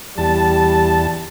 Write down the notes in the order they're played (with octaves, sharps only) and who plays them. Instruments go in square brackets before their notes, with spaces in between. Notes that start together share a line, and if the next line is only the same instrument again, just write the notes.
[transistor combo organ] E2 A5 [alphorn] G3